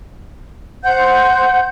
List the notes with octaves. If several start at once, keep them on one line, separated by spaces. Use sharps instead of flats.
C5 F#5 G6